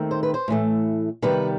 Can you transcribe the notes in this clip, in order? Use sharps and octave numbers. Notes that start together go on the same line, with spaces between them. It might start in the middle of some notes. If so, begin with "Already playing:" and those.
Already playing: D#2 D#3 A3 C4
C5
B4
C5
A2 E3 A3
C3 D#3 G3 B3 B4